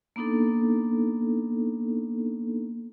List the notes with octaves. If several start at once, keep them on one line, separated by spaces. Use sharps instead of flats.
A#3 B3 D4 D#4 A4